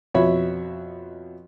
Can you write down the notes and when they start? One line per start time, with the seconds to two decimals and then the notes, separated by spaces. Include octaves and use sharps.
0.14 F2 B2 C#5 E5 B5